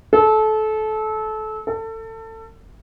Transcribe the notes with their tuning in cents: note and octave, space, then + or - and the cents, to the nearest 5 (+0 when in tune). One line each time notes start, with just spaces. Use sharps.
A4 -25
A4 +25